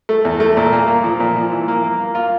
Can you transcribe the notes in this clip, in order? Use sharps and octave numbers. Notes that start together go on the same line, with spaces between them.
A3
E2
A3
A#2
A#3
A#3
F3
A#2
F3
E3
A#3
A#3
A#3
F4